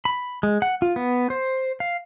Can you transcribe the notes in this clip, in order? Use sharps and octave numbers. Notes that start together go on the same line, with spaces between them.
B5
G#3
F#5
F4
B3
C5
F5